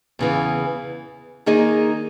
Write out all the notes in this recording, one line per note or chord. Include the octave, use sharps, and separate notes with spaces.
E2 C#3 E3 B3
D#3 A#3 D#4 G#4 D#5